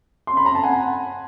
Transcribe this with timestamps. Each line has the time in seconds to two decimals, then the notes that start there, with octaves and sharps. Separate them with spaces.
0.27 C6
0.37 B5
0.46 A#5
0.55 A5
0.63 F#5 G#5